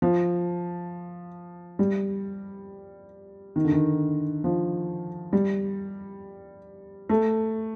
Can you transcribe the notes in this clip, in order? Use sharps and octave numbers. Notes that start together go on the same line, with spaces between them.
F3
G3
D#3
D3
D#3
F3
G3
A3